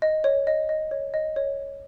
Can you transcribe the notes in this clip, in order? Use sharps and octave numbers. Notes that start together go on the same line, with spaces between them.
D#5
C#5
D#5
D#5
C#5
D#5
C#5